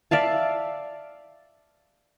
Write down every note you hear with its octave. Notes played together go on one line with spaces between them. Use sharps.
D5 E5 F5 A5